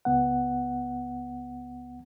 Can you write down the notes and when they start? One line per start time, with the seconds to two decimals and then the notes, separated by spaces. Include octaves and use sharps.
0.05 C#2 B3 F#5